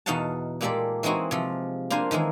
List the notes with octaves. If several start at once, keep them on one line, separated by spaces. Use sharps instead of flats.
E2 B2 D#4 F5 F#5 A5
A#2 G#3 A#3 G4 A4 D5
E3 G#3 C4 D#4 F#4
C3 F3
A#3 D4 F4 C5 G#5
D#3 E3 G#3 A#3